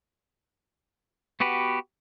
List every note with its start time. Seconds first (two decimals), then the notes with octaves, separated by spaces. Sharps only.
1.40 B3 F#4 G4 B4